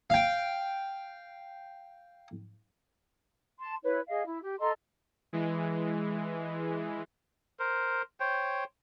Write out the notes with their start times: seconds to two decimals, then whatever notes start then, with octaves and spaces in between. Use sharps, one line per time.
0.10 F5 G5
3.59 A5 C6
3.84 E4 B4 C#5
4.08 G#4 D#5 F5
4.26 E4
4.42 G4
4.60 A4 D#5 A#5 C6
5.33 E3 G#3
7.59 A#4 C5
8.20 C5 C#5 G5